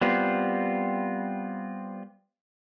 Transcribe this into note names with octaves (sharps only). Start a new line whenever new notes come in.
G3 B3 C4 F4